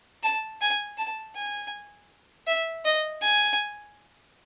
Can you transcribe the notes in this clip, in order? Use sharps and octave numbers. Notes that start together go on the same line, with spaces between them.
A5
G#5
A5
G#5
E5
D#5
G#5